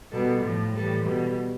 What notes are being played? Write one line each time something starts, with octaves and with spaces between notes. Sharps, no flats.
B2 G3 A4
A2 F3
A2 E3 G3 A4
B2 G3